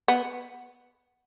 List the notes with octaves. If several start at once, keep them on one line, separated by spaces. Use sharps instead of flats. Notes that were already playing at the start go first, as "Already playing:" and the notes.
B3